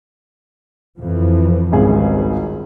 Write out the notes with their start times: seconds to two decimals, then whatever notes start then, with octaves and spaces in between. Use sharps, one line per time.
0.98 F2 E3 F3
1.72 G#1 C#2 G2 G#4